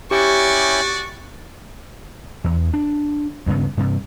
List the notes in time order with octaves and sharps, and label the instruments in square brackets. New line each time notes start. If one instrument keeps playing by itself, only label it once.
[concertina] C#4 E4 G5 [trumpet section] F#4 D5 [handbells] G4 [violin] C#6
[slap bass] E2
D4
D2 G2 C#3 B3
G2 C3